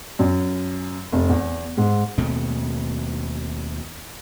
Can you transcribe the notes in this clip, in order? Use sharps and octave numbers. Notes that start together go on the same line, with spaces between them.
F#2
F1
E2
G#2
D#2 B2 A3 C4